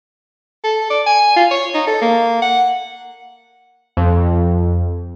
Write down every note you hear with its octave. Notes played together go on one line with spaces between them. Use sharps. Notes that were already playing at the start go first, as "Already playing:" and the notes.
A4
D5
G#5
F4
C#5
D#4
A4
A#3
F#5
F2